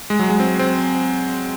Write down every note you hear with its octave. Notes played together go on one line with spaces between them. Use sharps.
G#3
F#3
G#3
C4
C4